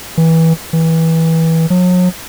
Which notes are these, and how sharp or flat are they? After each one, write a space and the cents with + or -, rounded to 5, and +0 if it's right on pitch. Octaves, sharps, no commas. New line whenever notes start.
E3 -20
E3 -20
F#3 -40